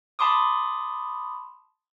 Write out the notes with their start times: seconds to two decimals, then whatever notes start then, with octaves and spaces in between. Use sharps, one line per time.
0.19 A5 B5 C6 D6 D#6